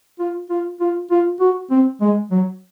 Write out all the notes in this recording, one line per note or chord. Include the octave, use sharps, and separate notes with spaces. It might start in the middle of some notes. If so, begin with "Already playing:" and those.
F4
F4
F4
F4
F#4
C4
G#3
F#3